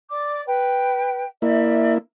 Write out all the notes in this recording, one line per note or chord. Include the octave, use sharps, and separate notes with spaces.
D5 D6
B4 G5
A#3 E4 D5 E5